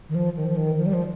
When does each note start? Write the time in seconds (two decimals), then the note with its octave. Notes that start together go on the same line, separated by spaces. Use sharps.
0.09 D#3
0.15 F3
0.36 D#3
0.46 F3
0.56 D#3
0.78 F3
0.86 G3
0.93 F3